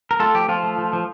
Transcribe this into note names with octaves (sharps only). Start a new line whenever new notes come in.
A#4
A3 F4 A4
F3 G4
F3 F4
A3
F3
F3